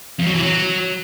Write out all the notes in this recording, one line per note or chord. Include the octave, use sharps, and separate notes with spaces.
F2
F#3
E3
F#3